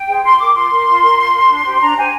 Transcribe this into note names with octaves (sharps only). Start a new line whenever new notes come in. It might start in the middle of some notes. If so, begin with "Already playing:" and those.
Already playing: G5
G#4 C5
F4 C6
A#4 D6
F4 C6
A#4
F4
A#4
F4
A#4
D4
G4 C5
D4 A#5
G4 C5 G#5